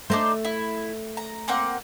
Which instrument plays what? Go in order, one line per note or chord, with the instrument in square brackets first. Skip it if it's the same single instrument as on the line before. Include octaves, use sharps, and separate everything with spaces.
[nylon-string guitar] A3 [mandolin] D4 D#4 C5
[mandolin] E4
A#5
A#3 C4 F#5